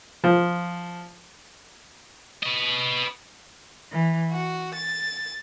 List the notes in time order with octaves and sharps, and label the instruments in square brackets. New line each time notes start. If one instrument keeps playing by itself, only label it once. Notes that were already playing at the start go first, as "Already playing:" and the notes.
[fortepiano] F3
[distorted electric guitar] B4 D#5
[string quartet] E3
F#4
A6